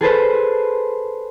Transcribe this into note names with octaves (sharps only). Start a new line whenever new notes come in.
G#4 A4 B4 C5